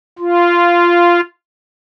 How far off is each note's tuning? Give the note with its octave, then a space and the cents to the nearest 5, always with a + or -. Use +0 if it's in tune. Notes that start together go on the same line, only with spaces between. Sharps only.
F4 -10